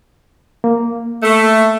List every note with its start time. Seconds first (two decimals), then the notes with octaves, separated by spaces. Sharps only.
0.64 A#3
1.23 A3